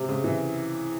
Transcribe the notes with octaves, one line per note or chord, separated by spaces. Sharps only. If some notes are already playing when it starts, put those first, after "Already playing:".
Already playing: C3
C#3
E3